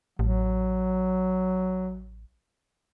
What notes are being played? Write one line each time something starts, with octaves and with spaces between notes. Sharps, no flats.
A1 F#3